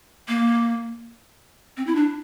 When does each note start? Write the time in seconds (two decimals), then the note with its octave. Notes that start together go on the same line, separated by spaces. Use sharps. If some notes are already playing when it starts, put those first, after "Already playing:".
0.28 A#3
1.77 C4
1.87 E4
1.95 D4